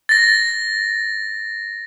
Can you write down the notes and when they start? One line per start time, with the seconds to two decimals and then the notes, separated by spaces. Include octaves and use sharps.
0.09 A6 A#6